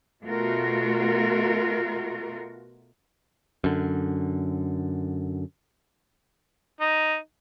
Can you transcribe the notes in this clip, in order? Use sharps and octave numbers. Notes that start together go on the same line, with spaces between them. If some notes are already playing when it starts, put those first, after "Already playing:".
B2 A3 F4 F#4 A#4
F#2 D3
D#4